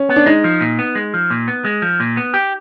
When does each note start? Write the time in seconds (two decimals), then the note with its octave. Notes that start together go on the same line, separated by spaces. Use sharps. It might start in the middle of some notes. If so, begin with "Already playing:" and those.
Already playing: C#4
0.09 B3
0.16 D4
0.26 G#3 D#4
0.44 F3
0.61 A#2
0.79 B3
0.95 G#3
1.14 F3
1.30 A#2
1.48 B3
1.64 G#3
1.82 F3
2.00 A#2
2.17 B3
2.34 G4